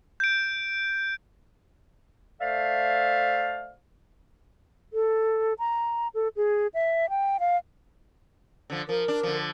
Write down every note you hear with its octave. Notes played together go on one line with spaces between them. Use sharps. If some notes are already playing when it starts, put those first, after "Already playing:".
G6 D7
A3 A4 C5 D5 E5 F5
A4
A#5
A4
G#4
E5
G5
F5
D3 F3
F3 A#4
D4
D3 F3